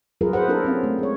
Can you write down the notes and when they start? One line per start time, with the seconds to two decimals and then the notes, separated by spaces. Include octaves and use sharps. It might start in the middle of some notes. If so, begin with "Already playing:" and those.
0.21 F#3 G3 F4 G#4 A#4 B4
0.33 E4 G#4 B4 C5 F#5
0.48 B3 D4 G4 A4 A#4
0.64 C4 C#4 F5
0.83 A3
0.99 G#3 C#5